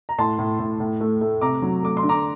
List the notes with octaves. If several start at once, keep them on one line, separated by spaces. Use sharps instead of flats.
A#5
A2 A5 C6
A2
A2
A2
A3
A3
C3 A#5 D6
F#3
A3 D6
C6
D3
A#5 D6